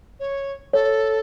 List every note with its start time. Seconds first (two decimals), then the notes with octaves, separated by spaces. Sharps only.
0.20 C#5
0.73 A4 C#5